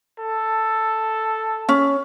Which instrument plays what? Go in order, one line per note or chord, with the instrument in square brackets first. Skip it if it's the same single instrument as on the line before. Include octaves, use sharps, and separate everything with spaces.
[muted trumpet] A4
[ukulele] C#4